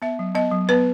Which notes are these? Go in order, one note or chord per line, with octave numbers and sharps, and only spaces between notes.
B3 E5
F#3
B3 D#5
F#3
B3 B4